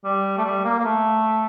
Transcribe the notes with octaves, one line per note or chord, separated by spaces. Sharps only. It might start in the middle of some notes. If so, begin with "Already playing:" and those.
G3
A3
G3
A#3
A#3
A3